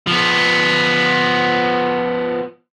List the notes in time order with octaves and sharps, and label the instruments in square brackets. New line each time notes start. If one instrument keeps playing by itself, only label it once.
[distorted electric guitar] F3 B3